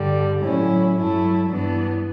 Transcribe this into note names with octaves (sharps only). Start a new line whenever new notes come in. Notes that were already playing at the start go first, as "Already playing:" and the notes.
Already playing: G2 D3 G3
A2 F#3 C#4 E4
G2 F#3 A3 E4
G2 E3 B3 D4